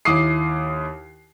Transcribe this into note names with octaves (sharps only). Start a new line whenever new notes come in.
D#2 E4 D6 D#6 C7